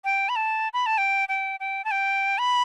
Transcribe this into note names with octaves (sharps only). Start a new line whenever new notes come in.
G5
B5
A5
B5
A5
G5
G5
G5
A5
G5
B5